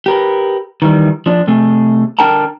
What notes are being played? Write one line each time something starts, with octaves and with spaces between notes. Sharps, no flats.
G4 A#4 B4
D#3 E3 G3
F3 D4
C3 A3 G#4
D3 D4 A#4 G5 A5 A#5